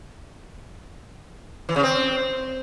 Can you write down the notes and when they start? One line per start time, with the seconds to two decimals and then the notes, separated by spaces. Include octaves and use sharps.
1.69 E3
1.76 C#3
1.83 C4